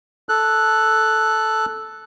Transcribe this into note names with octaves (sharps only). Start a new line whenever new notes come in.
A4 F#6